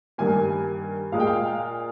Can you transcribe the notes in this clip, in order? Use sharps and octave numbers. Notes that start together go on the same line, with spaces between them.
G2 D#3 G3 A#3 G#5
A#2 G#3 F5
G5
F5